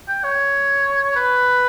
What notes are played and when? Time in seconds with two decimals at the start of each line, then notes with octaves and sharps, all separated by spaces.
0.08 G5
0.24 C#5
1.16 B4